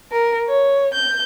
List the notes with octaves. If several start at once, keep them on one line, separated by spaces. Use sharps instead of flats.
A#4
C#5
G6